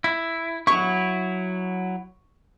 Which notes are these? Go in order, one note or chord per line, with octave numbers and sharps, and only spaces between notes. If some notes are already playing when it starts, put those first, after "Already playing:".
E4
F#3 E4 C#6